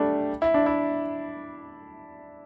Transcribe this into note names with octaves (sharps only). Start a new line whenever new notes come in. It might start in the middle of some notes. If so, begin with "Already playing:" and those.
Already playing: G3 A3 D4
E4
D4
E4